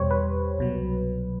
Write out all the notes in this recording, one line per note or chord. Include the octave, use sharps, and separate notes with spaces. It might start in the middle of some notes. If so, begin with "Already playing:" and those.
Already playing: E2 B2 G3 G4 C5 C#5
B4
C2 B2 F#3